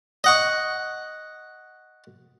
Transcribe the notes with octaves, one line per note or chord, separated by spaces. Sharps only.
D#5 F#5 C#6